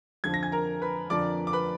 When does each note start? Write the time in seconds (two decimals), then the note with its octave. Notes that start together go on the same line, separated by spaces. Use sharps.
0.24 F2 D3 F3 G#6
0.34 A#6
0.43 G#5 G#6
0.52 A#4 A#5
0.82 B4 B5
1.10 F2 D3 F3 D5 D6
1.47 D6
1.53 B4 B5